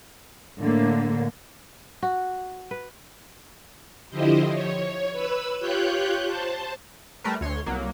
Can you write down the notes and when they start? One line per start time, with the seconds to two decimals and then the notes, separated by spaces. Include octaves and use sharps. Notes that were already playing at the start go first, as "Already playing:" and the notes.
0.60 A2 D3 A#3
2.03 F#4
2.71 B4
4.10 D3 F3 E4 G4 C5 D#5
4.50 C#5
5.11 B4 B5 E6
5.59 F4 G4 C#5 F#6 G6
6.26 C5 A5
7.24 G3 A3 A#4 B4
7.41 D2 C#5 C6
7.66 C2 F#3 A#3